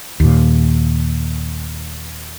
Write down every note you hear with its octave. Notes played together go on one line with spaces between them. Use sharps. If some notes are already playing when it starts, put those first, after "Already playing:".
D#2 A#2